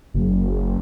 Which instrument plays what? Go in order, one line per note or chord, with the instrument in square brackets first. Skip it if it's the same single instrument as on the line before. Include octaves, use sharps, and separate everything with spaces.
[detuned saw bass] F#1